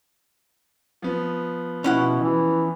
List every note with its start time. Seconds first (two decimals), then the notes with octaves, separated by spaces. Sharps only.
1.02 F3 B3
1.84 B2 C#4 E4 F#5
2.20 E3